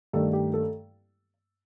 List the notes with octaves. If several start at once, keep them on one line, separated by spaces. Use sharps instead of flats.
G2 D#3 A3 D4 A4
G4
A4